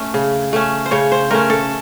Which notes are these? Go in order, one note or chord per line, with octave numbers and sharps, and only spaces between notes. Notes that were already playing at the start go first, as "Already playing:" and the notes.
Already playing: A3 C#4
C#3
A3 C#4
C5
C#3 C#5
C5
A3 C#4 A#4
A4